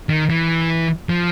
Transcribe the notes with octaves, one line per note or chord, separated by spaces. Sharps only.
D#3
E3
F3